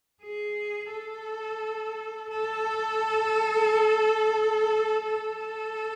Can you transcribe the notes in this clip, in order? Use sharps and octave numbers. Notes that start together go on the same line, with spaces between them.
G#4
A4
A4
A4